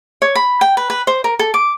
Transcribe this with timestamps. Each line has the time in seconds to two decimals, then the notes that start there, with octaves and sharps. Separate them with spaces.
0.22 C#5
0.35 B5
0.61 G5
0.77 B4
0.90 B4
1.07 C5
1.24 A#4
1.39 A4
1.54 D6